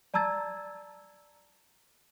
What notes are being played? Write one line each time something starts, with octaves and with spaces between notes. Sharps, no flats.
D5 A5 A#5 E6 G#6 A6